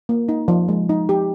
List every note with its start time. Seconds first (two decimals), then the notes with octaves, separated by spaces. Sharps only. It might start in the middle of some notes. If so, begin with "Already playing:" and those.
0.09 A#3
0.29 D#4
0.48 F3
0.69 G#3
0.89 D#4
1.09 G4